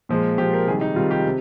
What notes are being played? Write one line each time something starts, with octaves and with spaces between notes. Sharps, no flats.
A#2 F3 G#3
A#2 F3 G#3 G4
A#4
C3 D#3 G3 G#4
D#4
C3 D#3 G3 F4
G4
C3